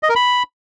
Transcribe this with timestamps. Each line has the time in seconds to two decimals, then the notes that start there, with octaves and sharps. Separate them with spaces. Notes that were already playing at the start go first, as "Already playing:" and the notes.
0.03 D#5
0.09 A#4
0.16 B5